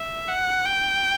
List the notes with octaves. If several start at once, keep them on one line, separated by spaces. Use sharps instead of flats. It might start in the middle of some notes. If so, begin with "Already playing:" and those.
Already playing: E5
F#5
G5